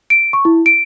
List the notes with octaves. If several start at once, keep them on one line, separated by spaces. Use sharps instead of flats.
D7
C#6
E4
D7